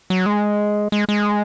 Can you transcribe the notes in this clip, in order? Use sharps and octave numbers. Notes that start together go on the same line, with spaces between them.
F#3
G#3
G#3
G#3